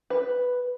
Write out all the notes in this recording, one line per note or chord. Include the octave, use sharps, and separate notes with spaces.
B4